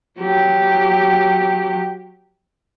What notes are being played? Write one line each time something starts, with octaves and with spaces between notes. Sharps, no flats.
F#3 G4